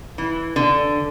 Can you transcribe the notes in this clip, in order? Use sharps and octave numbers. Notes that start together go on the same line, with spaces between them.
E3
D3